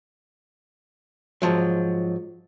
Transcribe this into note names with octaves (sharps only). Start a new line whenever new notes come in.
G#2 B2 F3 F#3